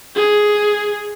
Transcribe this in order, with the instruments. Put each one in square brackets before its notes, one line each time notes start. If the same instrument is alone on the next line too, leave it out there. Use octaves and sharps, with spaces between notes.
[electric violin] G#4